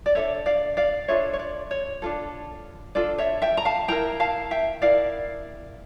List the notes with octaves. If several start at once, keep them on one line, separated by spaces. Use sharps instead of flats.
D5
D4 F4 A4 C#5 E5
D5 F5
D5 F5
D4 F4 A4 C#5 E5
C#5
D5
C#5
D4 F4 A4
D4 F4 A4 D5
C#5 E5
E5 G5
A#5
F5 A5
E4 A#4 G5 A#5
F5 A5
E5 G5
E4 A#4 D5 F5